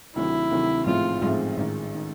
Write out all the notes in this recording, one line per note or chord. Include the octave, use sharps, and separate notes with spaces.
D2 C3 D#3 F#3 E4
D2 C3 D#3 F#3
A1 G#2 F3 A3 C4 F4
A1 G#2 F3 A3 C4
A1 G#2 D#3
D#3